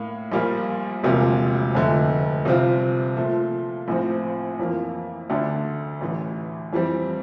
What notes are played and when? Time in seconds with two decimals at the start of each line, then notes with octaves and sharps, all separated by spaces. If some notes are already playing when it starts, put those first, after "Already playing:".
Already playing: A2 A#3
0.32 A#1 A#2 G3 A#3 F4
1.03 E1 D2 C3 F3 A#3
1.74 F1 F2 D3 A3
2.45 C2 C3 F3 C4 F4
3.17 A#2 F3 A3
3.88 A#1 A2 F3 C4
4.59 F2 E3 A#3
5.30 D2 D3 A3 D4
6.01 A1 A2 E3
6.73 F2 E3 G3 C4